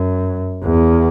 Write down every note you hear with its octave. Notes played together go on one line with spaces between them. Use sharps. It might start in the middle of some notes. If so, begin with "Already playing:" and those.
Already playing: F#2
E2